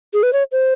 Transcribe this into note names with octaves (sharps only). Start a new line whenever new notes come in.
G#4
B4
C#5
C5